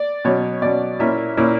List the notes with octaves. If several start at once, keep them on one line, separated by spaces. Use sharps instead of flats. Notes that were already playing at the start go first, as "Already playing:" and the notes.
Already playing: D5
B2 F#3 C#4 C#5
B2 F#3 C#4 D5
A#2 A#3 C#4 E4 E5
A#2 A#3 C#4 E4